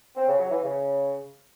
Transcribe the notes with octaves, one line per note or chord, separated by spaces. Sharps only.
C4
C#3
F#3
E3
C#3